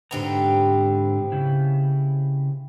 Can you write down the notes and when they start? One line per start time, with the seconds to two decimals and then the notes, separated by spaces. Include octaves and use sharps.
0.11 G#2 D3 B3 C4 G4 A#5
1.32 C#3 E4